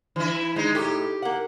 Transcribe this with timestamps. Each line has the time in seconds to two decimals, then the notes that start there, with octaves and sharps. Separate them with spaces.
0.16 E3 E4
0.56 G#3 D#4 C5
0.75 A2 D#4 G4
1.22 A#3 F#5